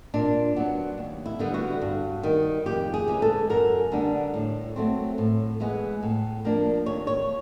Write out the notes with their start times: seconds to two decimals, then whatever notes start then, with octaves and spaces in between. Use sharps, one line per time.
0.14 A#2 D4
0.56 F#3 B3 D4
0.98 D#2
1.26 E4
1.39 D3 G3 B3
1.54 F#4
1.82 G2
2.23 D#3 G3
2.66 F2 G4
2.94 G#4
3.08 C#3 E3 G#3
3.22 A4
3.50 F#2 A#4
3.92 D3 G3 B3 D4
4.34 A2
4.76 F#3 A3 C4
5.18 A2
5.60 E3 G#3 B3
6.03 A2
6.45 F3 A#3 D4
6.86 D#2 C#5
7.07 C#5